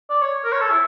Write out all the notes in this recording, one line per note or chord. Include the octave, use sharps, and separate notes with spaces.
D5
C#5
A#4
C#5
A4
E4